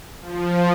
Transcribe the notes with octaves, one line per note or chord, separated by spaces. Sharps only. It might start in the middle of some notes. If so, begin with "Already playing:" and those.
F3